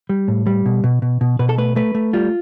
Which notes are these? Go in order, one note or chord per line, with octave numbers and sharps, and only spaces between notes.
G3
A2
G3
B2
B2
B2
B2
B2 B4
A4
A3 B4
A3 B4
A3
G3 F4